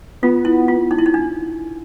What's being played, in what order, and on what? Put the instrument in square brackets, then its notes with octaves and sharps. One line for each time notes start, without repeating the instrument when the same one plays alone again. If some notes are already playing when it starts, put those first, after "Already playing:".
[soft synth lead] B3 [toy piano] F4
[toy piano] E4
F4
D#4
E4
D#4
D4